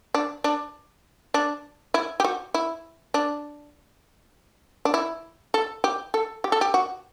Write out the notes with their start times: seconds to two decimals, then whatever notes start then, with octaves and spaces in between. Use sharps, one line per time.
0.14 D4
0.44 D4
1.34 D4
1.94 E4
2.20 G4
2.24 F#4
2.54 E4
3.14 D4
4.85 D4
4.94 E4
5.54 A4
5.84 G4
6.14 A4
6.44 G4
6.52 A4
6.61 G4
6.74 F#4